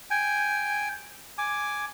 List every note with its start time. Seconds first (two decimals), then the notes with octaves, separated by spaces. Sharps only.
0.11 G5 G#5
1.38 G#5 D6